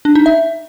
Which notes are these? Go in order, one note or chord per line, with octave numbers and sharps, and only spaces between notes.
D4
D#4
E5